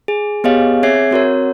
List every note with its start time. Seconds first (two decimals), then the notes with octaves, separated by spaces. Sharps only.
0.08 G#4
0.44 B3 G4 G#4 C#5 D#5 F5
0.83 C4 G#4 C#5 E5 G#6 C7
1.11 C4 F#4 A#4 C#5